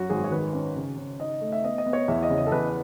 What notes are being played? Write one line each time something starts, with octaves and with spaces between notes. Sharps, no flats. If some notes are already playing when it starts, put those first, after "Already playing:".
Already playing: F#2 F#4
G#1 G#4
C#5
D#3 B4
C#4 C#5
C#3
C#3
D#4 D#5
A3
E5
B3 D#5
D#5
B3
C#5
E2 E5
D#5
C#3
D#5
A4
E2 B4